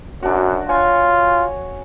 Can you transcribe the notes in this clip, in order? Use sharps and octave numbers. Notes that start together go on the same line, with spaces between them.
F#2 D4 F#4
F4 C#5 G#5